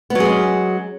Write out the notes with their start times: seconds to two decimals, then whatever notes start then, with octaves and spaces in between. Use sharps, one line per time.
0.10 B3
0.15 F#3
0.20 G#4
0.25 G#3
0.30 C#4